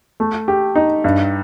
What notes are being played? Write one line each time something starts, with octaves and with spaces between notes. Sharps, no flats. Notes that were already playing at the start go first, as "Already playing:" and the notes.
A3
G4
D#4
G2